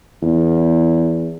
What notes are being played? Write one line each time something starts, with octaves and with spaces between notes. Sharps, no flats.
E2